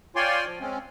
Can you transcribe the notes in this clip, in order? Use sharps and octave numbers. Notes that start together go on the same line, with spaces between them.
F4 C#5 D5 G5 G#5 C6
F3
G#3 C4 C#4